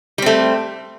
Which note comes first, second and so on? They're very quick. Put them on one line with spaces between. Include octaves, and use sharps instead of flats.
G3 C4 A3